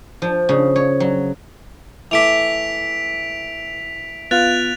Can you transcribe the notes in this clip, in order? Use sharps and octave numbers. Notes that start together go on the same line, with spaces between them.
F3
C#3
C#5
F#3
E3 A3 D6 B6 D7 F7
B3 F4 F5 F#6 A6 F7